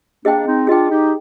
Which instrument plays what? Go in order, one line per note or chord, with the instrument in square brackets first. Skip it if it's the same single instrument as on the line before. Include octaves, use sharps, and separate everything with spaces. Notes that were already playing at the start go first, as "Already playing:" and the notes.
[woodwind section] A#3 D4 [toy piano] G#4 D#5 G5
[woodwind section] C4 D#4
[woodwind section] D4 F4 [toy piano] G#4 D#5 G5
[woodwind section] D#4 G4